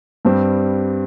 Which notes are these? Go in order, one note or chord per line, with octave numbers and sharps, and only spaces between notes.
G2 G3 C4